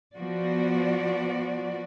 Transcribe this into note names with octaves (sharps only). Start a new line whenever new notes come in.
F3 B3 F#4 D5